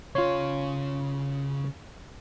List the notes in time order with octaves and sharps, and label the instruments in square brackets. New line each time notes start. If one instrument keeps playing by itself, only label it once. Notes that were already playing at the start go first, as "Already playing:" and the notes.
[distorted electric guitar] C#3 F5 [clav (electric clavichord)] F4 C#5